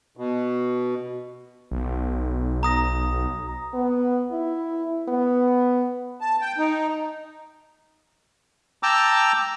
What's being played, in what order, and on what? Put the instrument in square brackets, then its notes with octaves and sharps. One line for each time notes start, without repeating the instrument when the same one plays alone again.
[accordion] B2
[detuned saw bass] B1
[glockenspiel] A#5 D#6 A#6
[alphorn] B3
E4
B3
[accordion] A5
G5
D#4
[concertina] G5 A5 A#5 D6 E6